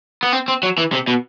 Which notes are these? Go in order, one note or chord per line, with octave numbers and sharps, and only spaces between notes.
B3
C4
C4
F#3
E3
C3
B2